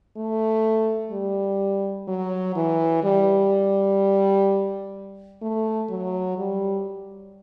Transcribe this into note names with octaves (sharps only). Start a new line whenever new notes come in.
A3
G3
F#3
E3
G3
A3
F#3
G3